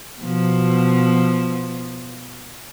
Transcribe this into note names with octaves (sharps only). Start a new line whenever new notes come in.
B2 F3